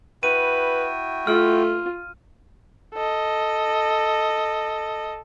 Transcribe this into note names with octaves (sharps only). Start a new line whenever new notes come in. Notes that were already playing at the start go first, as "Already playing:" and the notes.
E4 F#4 B4 G5 D#7
A3 F4 F6
A4 D#5